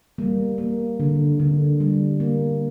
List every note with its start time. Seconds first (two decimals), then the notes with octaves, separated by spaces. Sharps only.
0.18 G3 A#3
0.58 A#3
1.00 D3
1.40 D3
1.80 G3
2.20 A#3